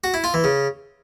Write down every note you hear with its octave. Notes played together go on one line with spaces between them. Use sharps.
F#4
E4
F4
E3
C#3